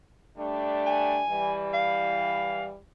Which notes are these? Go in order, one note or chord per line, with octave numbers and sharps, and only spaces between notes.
G3 A3 D4
G#5
E3 G3
F5